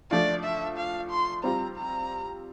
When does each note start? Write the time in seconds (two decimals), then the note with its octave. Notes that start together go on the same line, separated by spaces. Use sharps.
0.11 F3 A3 D4 F4 D5
0.44 E5
0.77 F5
1.10 C6
1.44 G3 C4 F4 A#5
1.77 A#5